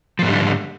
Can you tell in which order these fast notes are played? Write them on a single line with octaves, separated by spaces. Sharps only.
F3 G#2 G3 D3